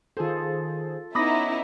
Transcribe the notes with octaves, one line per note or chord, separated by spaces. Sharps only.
D#3 F4 G#4 A4 C5
B3 C#4 D#4 E4 B5 D6 D#6 A#6